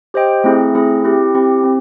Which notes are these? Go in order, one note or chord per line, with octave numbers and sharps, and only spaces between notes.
G4 C5 D#5 G5
A3 C4 E4 G#4
A3 C4 E4 G#4
C4 E4 G4
C4 E4 G4
C4